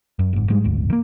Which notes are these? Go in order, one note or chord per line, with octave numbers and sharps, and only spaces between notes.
F#2
F#1 G#2
G#2 G3 G#3
F#1 D2 G#2
D#3 A#3